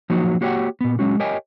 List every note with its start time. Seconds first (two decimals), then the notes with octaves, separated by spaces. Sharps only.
0.10 F3 F#3 A#3 D#4 F#4
0.41 A#3 F#4 G4 C#5 F#5 G5
0.81 A#2 B3
0.99 F#3 G#3 C#4 F#4
1.20 G4 A#4 C#5 D#5 G5 G#5